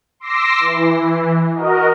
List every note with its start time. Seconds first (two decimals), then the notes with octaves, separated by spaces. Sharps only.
0.20 C6 D6 E6 A#6 C7
0.60 E3
1.53 F#4 A#4 D#5